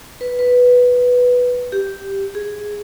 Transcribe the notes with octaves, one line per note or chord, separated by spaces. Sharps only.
B4
B4
G4
G#4